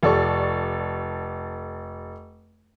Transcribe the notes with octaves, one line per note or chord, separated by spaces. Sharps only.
F1 A4 D5 C#6